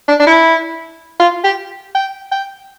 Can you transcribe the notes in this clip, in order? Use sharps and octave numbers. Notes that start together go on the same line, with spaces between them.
D4
D4
E4
F4
G4
G5
G5